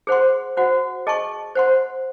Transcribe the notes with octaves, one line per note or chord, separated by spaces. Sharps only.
G#4 C5 F#5 C6
F#4 C5 F#5
G#4 D#5 A5 C#6
C5 F#5 C6